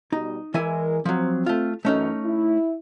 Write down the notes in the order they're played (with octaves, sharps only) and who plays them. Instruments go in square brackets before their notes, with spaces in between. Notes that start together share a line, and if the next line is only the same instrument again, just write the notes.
[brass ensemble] B2 G3 [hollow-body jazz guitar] D#4
[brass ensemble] E2 G#3 A#4 [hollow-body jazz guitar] E3 E4 G#5
[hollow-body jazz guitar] F3 F#3 [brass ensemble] C4
[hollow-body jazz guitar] A3 F4
[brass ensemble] F#2 E3 [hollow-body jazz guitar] A3 C#4 D#4
[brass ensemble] E4